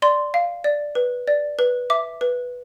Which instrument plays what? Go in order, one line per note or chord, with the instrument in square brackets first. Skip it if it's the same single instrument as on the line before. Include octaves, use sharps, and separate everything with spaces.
[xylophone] D5 C6
F5
D5
B4
D5
B4
E5 D6
B4